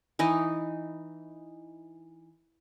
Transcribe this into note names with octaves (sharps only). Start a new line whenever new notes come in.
E3 D#4 D#5